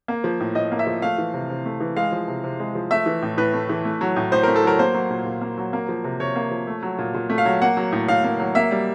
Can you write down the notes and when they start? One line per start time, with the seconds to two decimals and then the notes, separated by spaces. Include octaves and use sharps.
0.08 A#3
0.24 F3
0.40 A2
0.55 A2 D#5
0.72 A#3
0.79 E5
0.87 F3
1.02 A3 F5
1.18 E3
1.34 C3
1.50 C3
1.65 A3
1.81 E3
1.96 G#3 F5
2.12 F3
2.28 C3
2.44 C3
2.60 G#3
2.75 F3
2.91 A3 E5
3.06 E3
3.22 A2
3.38 A2 B4
3.54 A3
3.69 E3
3.85 A3
4.01 F#3
4.16 A2
4.32 A2 C5
4.43 A3 A#4
4.56 A4
4.64 F#3 A#4
4.79 A#3 C5
4.94 F#3
5.11 A#2
5.26 A#2
5.42 A#3
5.58 F#3
5.73 A#3
5.89 F3
6.04 C3
6.20 C3 C#5
6.36 A#3
6.51 F3
6.67 A3
6.83 F#3
6.99 A#2
7.14 A#2
7.30 A3
7.38 F5
7.46 F#3
7.62 A#3 F#5
7.77 F#3
7.92 A2
8.08 A2 F5
8.24 A#3
8.40 F#3
8.55 A#3 E5
8.71 G3